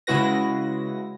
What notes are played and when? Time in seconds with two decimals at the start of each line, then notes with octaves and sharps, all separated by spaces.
0.07 C#3 G#3 E4 F#4 B4 A#6